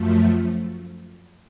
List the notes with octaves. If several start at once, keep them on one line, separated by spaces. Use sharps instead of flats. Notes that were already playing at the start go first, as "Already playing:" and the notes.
Already playing: F#2 F3 A3